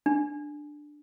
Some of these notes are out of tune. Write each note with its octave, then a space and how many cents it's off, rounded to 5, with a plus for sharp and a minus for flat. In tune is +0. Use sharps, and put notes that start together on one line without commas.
D4 +10